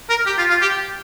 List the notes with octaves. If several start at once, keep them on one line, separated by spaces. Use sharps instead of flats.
A#4
G4
F4
F4
G4